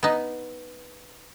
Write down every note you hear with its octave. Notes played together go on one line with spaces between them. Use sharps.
B3 D#4